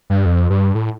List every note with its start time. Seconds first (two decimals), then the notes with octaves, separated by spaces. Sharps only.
0.10 G2
0.26 F2
0.50 G2
0.75 A2